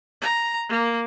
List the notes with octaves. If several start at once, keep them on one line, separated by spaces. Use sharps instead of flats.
A#5
A#3